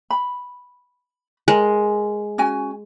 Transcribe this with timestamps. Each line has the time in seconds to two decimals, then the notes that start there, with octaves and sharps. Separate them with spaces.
0.11 B5
1.48 G#3 A#4
2.38 C#4 F#4 G#5